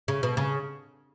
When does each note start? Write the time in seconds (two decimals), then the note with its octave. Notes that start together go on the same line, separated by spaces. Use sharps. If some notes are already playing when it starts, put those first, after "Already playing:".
0.08 C#3
0.23 B2
0.37 C#3